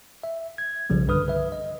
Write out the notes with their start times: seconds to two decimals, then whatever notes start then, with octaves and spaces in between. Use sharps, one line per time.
0.23 E5
0.58 G#6
0.90 B1 C#3 F3 G3
1.07 C2 G2 D3 B4 D#6 F6
1.28 B4 E5
1.52 D#5